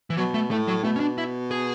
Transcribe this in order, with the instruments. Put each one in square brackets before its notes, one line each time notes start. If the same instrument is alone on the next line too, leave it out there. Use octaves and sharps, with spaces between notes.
[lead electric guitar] E3
[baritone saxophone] B2 [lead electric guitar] F#3
[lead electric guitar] A3
[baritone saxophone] A2 [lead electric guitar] A3
[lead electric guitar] F#3
[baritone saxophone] B2 [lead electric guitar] A3
[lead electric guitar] C#4
D4
E4
G#4